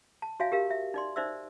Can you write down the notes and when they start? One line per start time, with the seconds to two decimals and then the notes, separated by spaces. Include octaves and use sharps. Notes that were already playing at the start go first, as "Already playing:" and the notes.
0.22 A5
0.40 F#4 C#5 E5 F5 G#5
0.52 G4 A#4 F5
0.70 E5
0.94 D#4 D5 C6
1.16 D#4 C5 D5 E5 E6